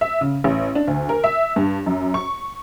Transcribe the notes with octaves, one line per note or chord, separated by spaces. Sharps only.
E5
C#3
A1
D4
D2
A#4
E5
G2
F#2
C#6